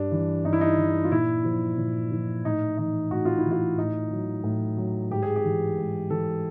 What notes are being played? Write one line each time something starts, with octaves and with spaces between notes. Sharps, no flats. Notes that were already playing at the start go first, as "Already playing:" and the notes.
Already playing: G2 D4
E3
G2 D#4
E4
D#4
E3
F4
A#2 E4
F3
A#2
F3
A2 D#4
E3 D#4
A2 F#4
F4
E4
E3
F4
A2 D#4
F#3
A2
F#3
G#2 G4
G#4
G4
E3
G#2
E3 A4